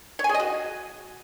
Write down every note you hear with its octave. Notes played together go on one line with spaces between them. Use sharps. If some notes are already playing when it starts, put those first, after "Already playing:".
C#5
G#5
G#4
D#5
F#4